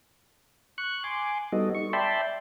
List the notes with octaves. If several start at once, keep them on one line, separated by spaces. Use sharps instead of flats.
C#6 F#6
G#5 C6 D6
G3 B3 D#4 F#4 A4 D#5
C#6
D5 E5 G5 A5 B5 C6